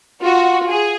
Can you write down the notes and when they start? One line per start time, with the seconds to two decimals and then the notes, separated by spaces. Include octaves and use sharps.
0.21 F4 F#4
0.68 G#4